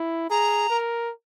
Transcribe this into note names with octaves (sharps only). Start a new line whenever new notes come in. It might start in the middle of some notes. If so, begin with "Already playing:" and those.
Already playing: E4
G#4 A#5
A#4